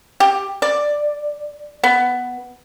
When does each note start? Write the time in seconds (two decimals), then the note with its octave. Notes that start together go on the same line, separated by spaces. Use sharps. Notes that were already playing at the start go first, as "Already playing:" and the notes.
0.20 G4
0.62 D5
1.84 B3